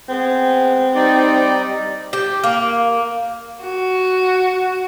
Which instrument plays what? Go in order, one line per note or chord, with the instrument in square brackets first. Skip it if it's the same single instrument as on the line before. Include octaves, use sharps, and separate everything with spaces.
[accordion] G#3 B3 [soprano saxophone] C4
[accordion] G3 D#4 D5
[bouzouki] G4
A#3
[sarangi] F#4